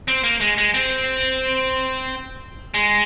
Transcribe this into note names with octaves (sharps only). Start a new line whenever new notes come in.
C4
A#3
G#3
G#3
C4
G#3